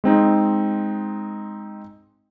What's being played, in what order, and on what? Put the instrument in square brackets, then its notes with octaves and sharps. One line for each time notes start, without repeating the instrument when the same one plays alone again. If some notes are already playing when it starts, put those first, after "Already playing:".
[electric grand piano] G#3 C4 D#4